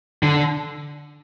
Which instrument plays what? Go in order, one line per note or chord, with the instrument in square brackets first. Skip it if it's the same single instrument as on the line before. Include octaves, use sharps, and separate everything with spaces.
[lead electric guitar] D3